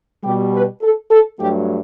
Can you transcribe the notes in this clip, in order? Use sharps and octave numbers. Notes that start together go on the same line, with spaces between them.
B2 G3 G4
B4
A4
A4
G2 F#3 A3 G4